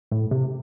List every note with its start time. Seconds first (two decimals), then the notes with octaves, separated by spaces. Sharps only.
0.12 A2
0.31 C3